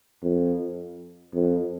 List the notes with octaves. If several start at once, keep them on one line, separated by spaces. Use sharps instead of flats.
F2
F2